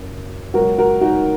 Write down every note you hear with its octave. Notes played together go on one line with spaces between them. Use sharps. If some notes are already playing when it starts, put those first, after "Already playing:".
Already playing: F#1 F#2 C#3 F#3
C#2 B2 F#3 F#4 A#4
F#4 A#4
D#4 F#4